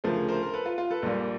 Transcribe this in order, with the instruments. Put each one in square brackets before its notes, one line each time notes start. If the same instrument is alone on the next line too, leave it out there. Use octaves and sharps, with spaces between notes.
[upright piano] D2 C#3 F3 A3 A#4 C5
A#4 C5
A#4
A4 B4
F4
F4
A4 B4
A#1 A#2 G3 A#3